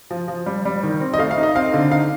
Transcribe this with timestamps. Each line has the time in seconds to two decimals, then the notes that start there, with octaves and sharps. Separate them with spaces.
0.11 F3
0.28 F3
0.46 G3
0.65 G3
0.83 D#3
1.00 C4
1.14 D#5
1.19 A3 F5
1.31 F5
1.38 D#4
1.43 D#5
1.55 C4 F5
1.74 D3
1.91 D#4 F5